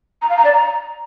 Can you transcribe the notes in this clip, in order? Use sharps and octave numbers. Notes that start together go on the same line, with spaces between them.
A#5
F5
A#5
D5
A#5